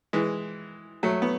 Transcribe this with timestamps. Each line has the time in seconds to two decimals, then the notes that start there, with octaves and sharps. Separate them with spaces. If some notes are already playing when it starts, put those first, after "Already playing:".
0.13 E3 G#3
1.03 F#3 A3
1.22 B3